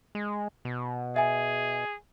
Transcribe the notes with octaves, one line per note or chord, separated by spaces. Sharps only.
G#3
B2
G#4 E5 G#5